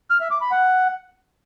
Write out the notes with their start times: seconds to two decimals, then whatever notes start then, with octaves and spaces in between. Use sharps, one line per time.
0.10 F6
0.21 E5
0.31 D6
0.41 B5
0.51 F#5